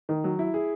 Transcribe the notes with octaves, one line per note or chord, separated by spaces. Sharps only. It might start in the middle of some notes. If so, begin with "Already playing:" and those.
D#3
F#3
E4
G#4